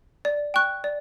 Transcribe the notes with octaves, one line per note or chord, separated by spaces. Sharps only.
D5
G5 C#6 F#6
D5